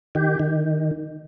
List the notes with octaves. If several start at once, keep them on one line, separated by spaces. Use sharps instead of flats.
D#3 G4
D#3